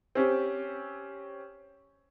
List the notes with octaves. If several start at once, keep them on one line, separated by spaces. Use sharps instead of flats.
C4 C#4 G4